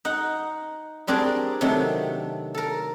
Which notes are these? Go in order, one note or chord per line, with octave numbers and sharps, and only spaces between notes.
D#4 F#5
G3 C4 D4 G#4 A#4 D5
C3 D#3 F#3 A3 D4
A4 A#4